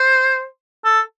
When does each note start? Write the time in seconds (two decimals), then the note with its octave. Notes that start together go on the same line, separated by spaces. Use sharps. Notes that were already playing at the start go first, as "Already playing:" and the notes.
Already playing: C5
0.84 A4